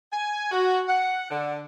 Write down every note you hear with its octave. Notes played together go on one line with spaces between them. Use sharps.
G#5
F#4
F#5
D3